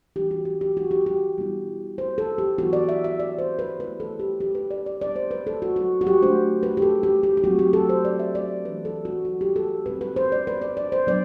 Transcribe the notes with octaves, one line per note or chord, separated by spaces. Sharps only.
E3 G3 D4 G4
F#4
G4
G4
F#4
G4
G4
B2 G3 B3 E4
C5
A4
G4
E3 B3 E4 F#4
D5
E5
E5
D5
C5
B4
D3 A3 E4 B4
A4
G4
G4
B4
D5
D5
B2 G3 B3 D5
C5
B4
A4
F#4
F#4
F#4
G4
D3 F#3 A3 D4 C5
B4
G4
A4
G4
G4
G4
F#3 A3 C4 F#4
G4
A4
C5
D5
E5
D5
E3 A3 D4 B4
A4
F#4
F#4
G4
A4
B2 G3 C4 B4
B4
C5
D5
B4
D5
D5
C5
F#3 B3 D4 D5